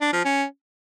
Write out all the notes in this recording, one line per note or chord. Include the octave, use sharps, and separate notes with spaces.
D4
F3
C#4